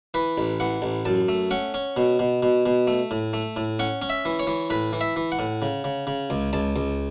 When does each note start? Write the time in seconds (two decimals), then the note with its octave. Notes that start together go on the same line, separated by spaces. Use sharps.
0.14 E3 B4
0.38 A1
0.60 E3 F#5
0.82 A1
1.05 F#2 A5
1.29 A3
1.51 C#4 F#5
1.74 C#4
1.97 B2
2.19 B2
2.43 B2
2.66 B2
2.87 A3
3.11 A2
3.33 A3
3.56 A2
3.79 C#4 F#5
4.02 C#4
4.10 E5
4.25 E3
4.40 C#5
4.47 E3
4.70 A2 B4
4.93 E3
5.01 E5
5.16 E3
5.32 F#5
5.39 A2
5.62 C#3
5.84 C#3
6.07 C#3
6.30 C#2
6.53 C#2 A5
6.76 C#2